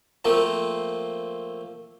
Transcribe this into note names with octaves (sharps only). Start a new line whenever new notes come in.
F3 A3 A#3 C4